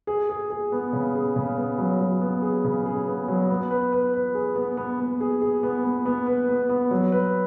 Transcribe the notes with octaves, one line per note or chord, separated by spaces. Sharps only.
G#4
G#4
G#4
B3
C#3
G#4
C#3
B3
F#3
F#3
B3
G#4
C#3
G#4
B3
F#3
B3
B4
B4
B4
G#4
B3
B3
B3
G#4
G#4
B3
B3
B3
B4
B3
B3
F#3
B4